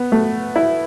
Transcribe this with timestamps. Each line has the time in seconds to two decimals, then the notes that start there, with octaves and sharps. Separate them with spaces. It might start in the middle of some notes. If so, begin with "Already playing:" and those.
Already playing: B3
0.12 A3
0.56 E4